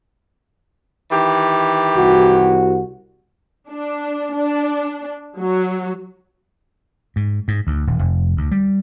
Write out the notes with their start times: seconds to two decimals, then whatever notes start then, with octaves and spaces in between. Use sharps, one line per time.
1.11 D#3 E3 G4
1.97 C2 F#4
3.69 D4
4.33 D4
5.38 F#3
7.16 G#2
7.48 G#2
7.67 D2
7.87 D#1
7.99 F1
8.37 D2
8.51 G3